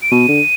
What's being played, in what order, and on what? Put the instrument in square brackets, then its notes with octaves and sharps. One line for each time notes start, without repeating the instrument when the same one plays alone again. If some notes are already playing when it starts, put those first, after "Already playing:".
[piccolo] D7
[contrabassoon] B2 [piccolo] D#7
[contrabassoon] D3